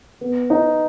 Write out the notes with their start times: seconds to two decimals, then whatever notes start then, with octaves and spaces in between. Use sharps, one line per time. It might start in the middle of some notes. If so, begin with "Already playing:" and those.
0.21 B3
0.50 D#4